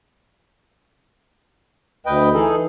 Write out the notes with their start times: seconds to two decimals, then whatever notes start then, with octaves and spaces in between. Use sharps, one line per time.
2.06 D2 B4 D#5 G5
2.34 E3 D#4 G#4 A4